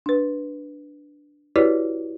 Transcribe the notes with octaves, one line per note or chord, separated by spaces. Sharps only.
D4 B4
E4 F#4 G4 B4 C#5 D5